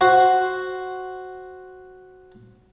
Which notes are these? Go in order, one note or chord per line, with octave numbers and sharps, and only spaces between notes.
F#4 C5